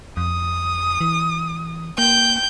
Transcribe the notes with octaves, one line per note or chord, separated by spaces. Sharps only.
F2 D#6
E3
A#3 G5 G6